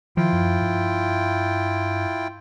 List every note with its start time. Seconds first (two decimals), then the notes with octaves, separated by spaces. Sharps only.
0.17 D#3 F3 E4 F4 G5
0.32 F#2
0.61 G2